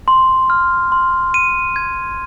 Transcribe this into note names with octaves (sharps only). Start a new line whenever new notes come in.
C6
F6
C6
D#7
G#6